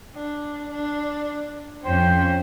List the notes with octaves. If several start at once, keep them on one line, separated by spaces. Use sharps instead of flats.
D4
D4
F2 C#4 C5 G5